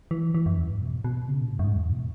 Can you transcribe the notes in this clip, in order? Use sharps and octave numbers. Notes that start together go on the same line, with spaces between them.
E3
E3
F#2
E2
G#2
B2
B2
C#3
A#2
G#2
F#2
G#2
E2
B2